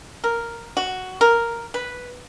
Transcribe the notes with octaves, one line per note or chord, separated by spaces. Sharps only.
A#4
F#4
A#4
B4